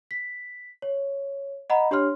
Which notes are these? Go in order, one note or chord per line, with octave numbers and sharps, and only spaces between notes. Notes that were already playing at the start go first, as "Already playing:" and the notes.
B6
C#5
D#5 F#5 A#5 B5
D4 G4 C#5 C6 F6